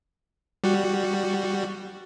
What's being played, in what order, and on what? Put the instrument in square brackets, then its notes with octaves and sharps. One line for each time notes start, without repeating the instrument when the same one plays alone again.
[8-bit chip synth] G3 F#4